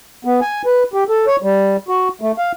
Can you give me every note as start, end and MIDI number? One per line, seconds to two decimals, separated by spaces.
0.25 0.40 59
0.41 0.62 80
0.66 0.83 71
0.94 1.04 67
1.09 1.26 69
1.27 1.36 73
1.42 1.77 55
1.88 2.08 66
2.21 2.32 57
2.38 2.52 77